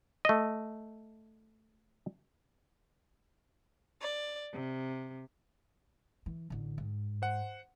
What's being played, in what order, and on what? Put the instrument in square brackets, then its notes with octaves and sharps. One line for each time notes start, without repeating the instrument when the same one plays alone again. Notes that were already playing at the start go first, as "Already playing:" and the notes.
[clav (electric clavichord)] A3 D#5
[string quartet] D5
C3
[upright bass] E3
A1 D3
G#2
[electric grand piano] C5 F#5